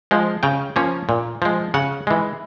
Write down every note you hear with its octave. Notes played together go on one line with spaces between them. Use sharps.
F3 G#3
C#3 G5
F3 A#3 C#4
A#2
F3 G#3
C#3 F#5
E3 G#3